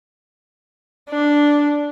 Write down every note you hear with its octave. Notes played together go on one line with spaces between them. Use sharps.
D4